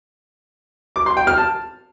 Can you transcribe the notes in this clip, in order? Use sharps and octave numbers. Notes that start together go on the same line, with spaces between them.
D6
C6
G5
F6
A5